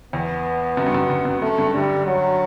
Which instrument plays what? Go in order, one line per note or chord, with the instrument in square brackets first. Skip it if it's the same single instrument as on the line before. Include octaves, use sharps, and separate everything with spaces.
[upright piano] E2 [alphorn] B3
[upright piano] F#2
G2
F#2
F#2
F#2
[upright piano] F#2 [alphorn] A3
[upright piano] G2
[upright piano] D3 [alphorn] G3
[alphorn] F#3